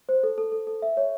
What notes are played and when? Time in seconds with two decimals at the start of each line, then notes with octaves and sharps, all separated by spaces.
0.09 C5
0.23 A4
0.38 A4
0.52 A4
0.67 A4
0.82 E5
0.97 C#5